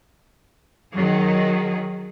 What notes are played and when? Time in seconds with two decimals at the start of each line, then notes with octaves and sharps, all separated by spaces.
0.94 D#3 F#3 G#4